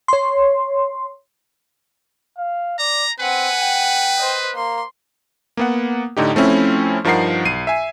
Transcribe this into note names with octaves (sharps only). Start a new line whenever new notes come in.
C#5 C6
F5
D5 A#5
C4 B4 F#5 G#5
G5
C5 D#5
A#3 C6
A#3 B3 F#5
A2 D3 D#4 G4
F3 A3 C4 C#4 E4
G2 F3 D#4 A#4 F#5 C7
B1 C7 D#7
E5 G#5